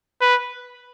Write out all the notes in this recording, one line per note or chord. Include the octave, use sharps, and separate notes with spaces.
B4